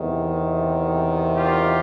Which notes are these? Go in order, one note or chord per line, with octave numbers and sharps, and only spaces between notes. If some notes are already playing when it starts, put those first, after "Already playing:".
Already playing: E2 C3 D#3
F4 G4